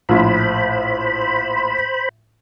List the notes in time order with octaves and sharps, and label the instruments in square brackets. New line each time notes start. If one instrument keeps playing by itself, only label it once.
[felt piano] A#1 A2 [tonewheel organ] C5 B5